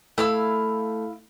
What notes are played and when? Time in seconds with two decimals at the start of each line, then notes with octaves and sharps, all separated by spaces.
0.18 A3 E4 F5 E6